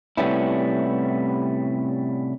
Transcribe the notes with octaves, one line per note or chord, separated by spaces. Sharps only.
A2 C3 G3 B3 C#4 E4